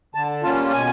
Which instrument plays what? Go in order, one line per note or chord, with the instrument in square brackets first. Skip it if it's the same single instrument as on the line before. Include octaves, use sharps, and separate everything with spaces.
[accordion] D3 A5
G3 A#3 C#4 F4 A5
B2 G#5